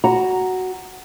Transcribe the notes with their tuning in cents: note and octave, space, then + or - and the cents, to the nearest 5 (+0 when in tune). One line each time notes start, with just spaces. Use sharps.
F#4 +5 A#5 +0